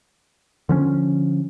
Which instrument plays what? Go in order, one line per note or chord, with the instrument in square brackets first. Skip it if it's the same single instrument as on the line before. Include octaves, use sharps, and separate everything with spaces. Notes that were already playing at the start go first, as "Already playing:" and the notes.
[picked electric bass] D3 F3 C#4